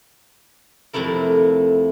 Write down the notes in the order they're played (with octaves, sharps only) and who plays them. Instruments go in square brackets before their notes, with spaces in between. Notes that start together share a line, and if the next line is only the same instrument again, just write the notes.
[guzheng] F2 C3 A3 E4 A#4